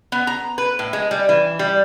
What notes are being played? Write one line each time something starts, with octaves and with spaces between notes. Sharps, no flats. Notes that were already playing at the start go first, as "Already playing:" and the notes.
B3
A#5
B4
A2
G#3
G3
E3
G3